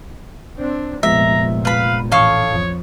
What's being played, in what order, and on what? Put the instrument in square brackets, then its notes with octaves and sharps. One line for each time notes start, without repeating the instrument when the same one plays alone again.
[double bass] C4 D4
[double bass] F1 A#2 [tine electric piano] F3 G#3 B3 [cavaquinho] E5 [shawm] A#5
[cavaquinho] B4 B5 [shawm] F5
[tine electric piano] A1 D#6 [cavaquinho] A4 F5 C#6 [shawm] C#5
[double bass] F2